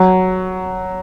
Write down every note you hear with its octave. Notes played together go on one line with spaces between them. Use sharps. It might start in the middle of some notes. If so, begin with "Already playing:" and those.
Already playing: F#3